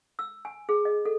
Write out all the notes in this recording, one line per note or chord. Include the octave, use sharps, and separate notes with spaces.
E6
G#5
G#4
D#5
A4